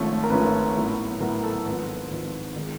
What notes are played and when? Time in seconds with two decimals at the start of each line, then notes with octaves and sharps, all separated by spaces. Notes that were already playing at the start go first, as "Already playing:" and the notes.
Already playing: G#1 G#2 F3 A3 C#4
0.24 A#4
0.30 G#1 G#2 F3 A3 C#4 B4
0.76 A2 F#3 B3
1.20 A2 F#3 B3 A#4
1.43 A4
1.65 G#1 G#2 F3 B4
2.11 G#1 G#2 F3
2.56 D#3 G#3